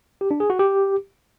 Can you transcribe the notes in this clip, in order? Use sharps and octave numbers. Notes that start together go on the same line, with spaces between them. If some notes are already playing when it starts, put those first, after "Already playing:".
G4
D4
G#4
F#4
G4